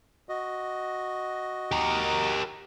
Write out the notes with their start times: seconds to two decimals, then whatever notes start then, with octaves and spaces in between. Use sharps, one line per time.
0.29 F#4 D#5
1.72 G4 A#4